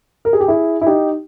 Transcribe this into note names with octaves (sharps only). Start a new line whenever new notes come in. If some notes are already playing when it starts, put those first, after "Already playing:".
A#4
G#4
G4
E4 G#4
E4
D#4 G4